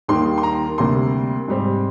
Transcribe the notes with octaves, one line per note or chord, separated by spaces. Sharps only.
D#2 D#3 G3 A#3 C6
C6
A#5
D2 C3 G3 A#3 C6
G#2 G3 C4